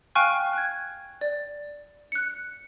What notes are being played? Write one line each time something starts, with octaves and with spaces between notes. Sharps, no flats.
F5 G5 G#5 C#6 F6 F#6
F#6 G#6
D5
F#6 C#7